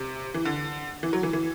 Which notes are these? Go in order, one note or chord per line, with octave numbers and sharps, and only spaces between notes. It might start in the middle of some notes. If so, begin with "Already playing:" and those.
Already playing: C3
E3
D3
E3
F#3
E3
E3